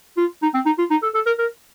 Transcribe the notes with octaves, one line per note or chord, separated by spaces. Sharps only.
F4
D#4
C4
D#4
F4
D#4
A4
A4
A#4
A#4